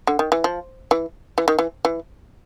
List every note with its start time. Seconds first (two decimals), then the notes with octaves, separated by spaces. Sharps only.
0.07 D3
0.19 D#3
0.32 E3
0.44 F3
0.91 E3
1.38 E3
1.48 D#3
1.59 E3
1.85 E3